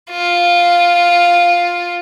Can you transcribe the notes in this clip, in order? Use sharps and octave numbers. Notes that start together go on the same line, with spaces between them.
F4